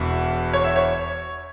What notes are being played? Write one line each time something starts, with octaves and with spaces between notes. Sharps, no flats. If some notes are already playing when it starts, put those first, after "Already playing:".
Already playing: E1 E2 B2 E5
C#5
E5
C#5